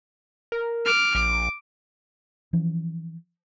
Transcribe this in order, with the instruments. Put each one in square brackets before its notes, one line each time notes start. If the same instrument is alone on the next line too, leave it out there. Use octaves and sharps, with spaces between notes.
[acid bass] A#4
[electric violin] D6 F6
[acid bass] A#1 [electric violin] D6
[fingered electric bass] E3 F3 C#4